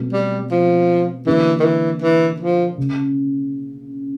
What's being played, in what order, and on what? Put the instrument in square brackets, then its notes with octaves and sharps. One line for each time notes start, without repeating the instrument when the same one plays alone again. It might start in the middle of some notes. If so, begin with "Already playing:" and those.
Already playing: [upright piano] B2 F#3 A3 C4
[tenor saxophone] G3
F3
[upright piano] D3 F#3 A#3 D4 [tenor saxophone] E3
[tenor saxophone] D#3
E3
E3
F3
[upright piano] C#3